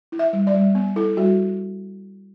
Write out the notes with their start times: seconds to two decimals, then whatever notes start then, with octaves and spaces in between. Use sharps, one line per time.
0.12 E4
0.19 E5
0.33 G3
0.47 D5
0.54 G3
0.75 B3
0.96 E4 A4
1.17 G3 F#4